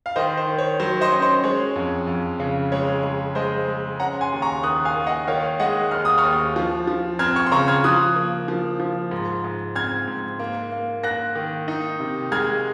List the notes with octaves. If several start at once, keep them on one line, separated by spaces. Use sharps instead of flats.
F5
D#3 C5 D#5
C5
D#3
C#5
F#3 C5
C5 D#5
C#4
C5
G#3 C#5
F2
F2
C#3
G#3 C#5
G#3
G#3 C5 D#5
G#3
C#4 F#5 A#5
G#5 C6
D#2
A#5 C#6
D#3 D#6 F#6
F5 G#5
A#3
D#5 F#5
D#3 C#5 F5
G#3 D#5 F#5
D#2 F6
D#6
C#6 F6
D#2
F3
F3
C4 F6 G#6
C#6 F6
C6
C#3 A#5 C#6
F6 G#6
F3 D#6 F#6
A#3
F3
F3
G#2
G#2
C4 F6 G#6
G#2
A#3
A#3
A#3 F#6 A#6
D#3
D#4
C3
G#3 F6 G#6